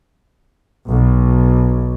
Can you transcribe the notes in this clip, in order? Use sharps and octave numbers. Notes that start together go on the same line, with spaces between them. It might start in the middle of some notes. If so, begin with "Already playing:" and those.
B1